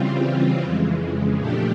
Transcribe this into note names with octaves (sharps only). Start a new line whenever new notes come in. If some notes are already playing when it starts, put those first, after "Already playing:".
Already playing: C#3 E3 G3 C4 F4
F2 C#3 E3 G#3
A#2 F3 A3 D4 G4